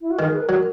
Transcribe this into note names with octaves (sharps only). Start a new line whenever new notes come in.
E4
F#4
D#3 G#4
B4
A#4
F#3